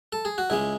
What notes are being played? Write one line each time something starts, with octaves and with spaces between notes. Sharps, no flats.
A4
G#4
F#4
C#2 C#3 G#3 E4